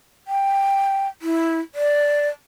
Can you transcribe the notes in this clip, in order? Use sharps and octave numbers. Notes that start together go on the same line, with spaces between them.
G5
E4
D5